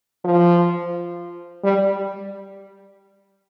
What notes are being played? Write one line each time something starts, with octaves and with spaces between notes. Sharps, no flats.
F3
G3